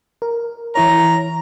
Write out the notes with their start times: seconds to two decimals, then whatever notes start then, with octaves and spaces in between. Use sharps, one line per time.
0.22 A#4
0.75 E3 E4 C#5 A#5